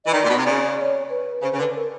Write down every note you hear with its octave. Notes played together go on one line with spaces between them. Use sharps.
E3 D#5
D#3 D5
A#2
B2
C3
C#3 D5
D5
C#5
B4
C#3 C5
C#3
D3 B4
A#4